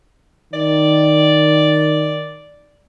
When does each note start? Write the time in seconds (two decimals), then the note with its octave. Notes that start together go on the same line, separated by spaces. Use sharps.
0.54 D#3 D5